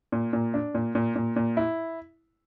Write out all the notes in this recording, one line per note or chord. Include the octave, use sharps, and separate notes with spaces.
A#2
A#2
D4
A#2
A#2
A#2
A#2
E4